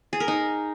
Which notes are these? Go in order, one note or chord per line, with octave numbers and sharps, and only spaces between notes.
G#4
A#4
D#4